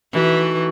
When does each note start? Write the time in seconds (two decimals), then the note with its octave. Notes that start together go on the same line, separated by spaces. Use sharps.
0.13 B2 E3 A3 D#4 F#4